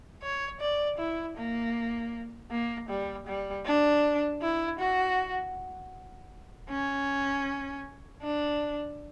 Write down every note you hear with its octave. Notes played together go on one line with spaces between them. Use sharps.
C#5
D5
E4
A#3
A#3
G3
G3
D4
E4
F#4
C#4
D4